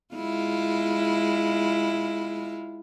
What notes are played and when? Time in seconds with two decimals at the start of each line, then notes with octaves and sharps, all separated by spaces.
0.15 G#3 E4 F4